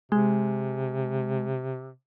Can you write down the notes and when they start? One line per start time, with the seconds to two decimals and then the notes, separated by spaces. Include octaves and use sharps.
0.12 C3 G#3